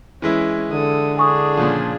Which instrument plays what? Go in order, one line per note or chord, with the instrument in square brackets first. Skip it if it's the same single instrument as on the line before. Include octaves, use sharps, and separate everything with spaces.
[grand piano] E3 G#3 E4 [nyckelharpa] C#4
[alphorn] D3 [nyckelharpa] A4 D#6
[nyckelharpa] D4 G#4 [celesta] G#5 C#6 D#6
[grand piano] A#2 C#3 F3